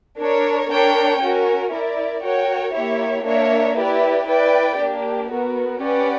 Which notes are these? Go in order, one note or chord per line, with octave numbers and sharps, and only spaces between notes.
D4 A#4 C#5
D4 A#4 C#5 G5
C#4 F#4 A#4
E4 A#4 D5
F#4 A#4 C#5 G5
A#3 E4 G4 C#5 E5
A#3 D4 A#4 C#5 E5
E4 G4 B4 D5
E4 B4 D5 G5
A#3 D4 G4
B3 F#4 A#4
C#4 G4 B4 D5 F#5